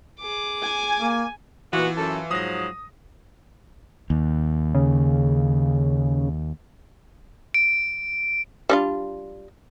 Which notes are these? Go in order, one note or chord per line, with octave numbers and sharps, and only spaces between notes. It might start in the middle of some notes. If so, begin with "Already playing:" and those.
G#4 D6
G#5
A#3
A#2 E3 B3 F4 F#4
F#2 A4
G#2 F3 F#3 D#6 A#6
D#2
C#3
D7
G3 D4 F4